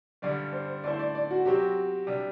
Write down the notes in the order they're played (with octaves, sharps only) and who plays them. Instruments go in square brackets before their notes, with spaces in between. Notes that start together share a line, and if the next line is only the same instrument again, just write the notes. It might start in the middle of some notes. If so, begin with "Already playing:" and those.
[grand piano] G2 D3 G3 [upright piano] D5
[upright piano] C5
[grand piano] D3 A3 E4 A4 C5 [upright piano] D5
[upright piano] D5
D5
F#4
[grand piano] C3 F#3 C4 F#4 [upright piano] G4
[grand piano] C3 G3 D4